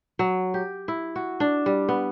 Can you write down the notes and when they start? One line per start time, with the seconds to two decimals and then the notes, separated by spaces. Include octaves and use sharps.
0.19 F#3
0.54 G4
0.88 E4
1.16 F#4
1.40 D4
1.66 G3
1.88 B3